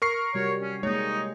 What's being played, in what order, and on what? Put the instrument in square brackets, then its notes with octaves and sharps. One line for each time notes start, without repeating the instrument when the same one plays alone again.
[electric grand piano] A#4 C#6 C7
[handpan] C3 G3 F#4 [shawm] C#5
[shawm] C#4
[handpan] G#3 A#3 [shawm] D#4 [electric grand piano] C#5